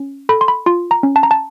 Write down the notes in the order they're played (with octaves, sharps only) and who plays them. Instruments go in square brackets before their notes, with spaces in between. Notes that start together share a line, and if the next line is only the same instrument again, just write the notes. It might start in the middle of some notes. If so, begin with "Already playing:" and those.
Already playing: [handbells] C#4
A4 B5
C6
B5
F4 C6
A#5
C#4
A5
A#5
A5